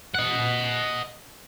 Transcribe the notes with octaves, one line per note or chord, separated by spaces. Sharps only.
D#5 F#5